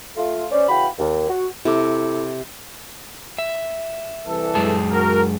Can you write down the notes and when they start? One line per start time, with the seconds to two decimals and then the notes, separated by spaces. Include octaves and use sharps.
0.16 A3 F4
0.51 C#4 C5 D5
0.68 C#3 E3 F#4 F5 G5 B5
0.98 D#2
1.29 F#4
1.65 C3 E4 A4 D6
3.38 E5
4.26 C2 E3 A4
4.55 F#2 G#3 A5
4.92 F#4 A#4